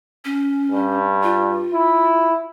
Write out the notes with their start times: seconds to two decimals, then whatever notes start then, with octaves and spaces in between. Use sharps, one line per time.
0.25 C#4
0.71 G2
1.23 F4
1.73 E4